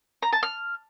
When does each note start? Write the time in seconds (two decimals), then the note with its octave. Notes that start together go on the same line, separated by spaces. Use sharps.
0.23 A#5
0.33 A5
0.43 F6